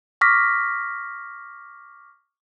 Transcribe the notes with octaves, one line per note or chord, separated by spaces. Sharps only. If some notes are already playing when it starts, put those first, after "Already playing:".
C#6 D6 F6 A#6 B6